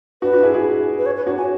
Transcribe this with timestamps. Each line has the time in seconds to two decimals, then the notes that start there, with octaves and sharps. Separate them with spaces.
0.22 D4 F#4 B4
0.32 D4 F#4
0.43 E4 G#4
0.54 E4 G#4
0.98 B4
1.06 C#5
1.16 B4
1.26 D4 F#4 C#5
1.38 G#5